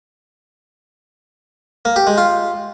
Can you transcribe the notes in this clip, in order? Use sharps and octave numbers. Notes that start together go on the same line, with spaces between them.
A#3
G4
G#3
F4